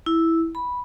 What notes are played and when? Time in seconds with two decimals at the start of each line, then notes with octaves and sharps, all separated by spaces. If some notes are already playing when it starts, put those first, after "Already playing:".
0.06 E4
0.55 B5